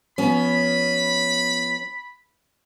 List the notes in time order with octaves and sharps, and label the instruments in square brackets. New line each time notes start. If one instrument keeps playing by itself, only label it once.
[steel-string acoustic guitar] F3 B3 C#4 [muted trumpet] B5